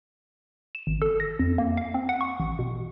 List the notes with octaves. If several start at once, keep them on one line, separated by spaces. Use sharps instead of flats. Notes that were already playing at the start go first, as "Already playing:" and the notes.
E7
G#1
A4
A#6
F2
A#3
F5
C4
F#5
C#6
A1
B2